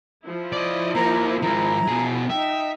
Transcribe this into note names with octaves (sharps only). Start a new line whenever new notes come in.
F3 E4
D5 D#5
A#3 D#4 A#5
G#2 D#3 A#5
B2 G#4
D#4 E5 G5